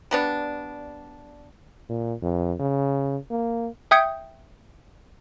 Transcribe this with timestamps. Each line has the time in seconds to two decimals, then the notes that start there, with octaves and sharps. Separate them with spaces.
0.11 G3 B3 D4
1.89 A#2
2.22 F2
2.60 C#3
3.31 A#3
3.91 E5 G5 D#6 G6 G#6 C#7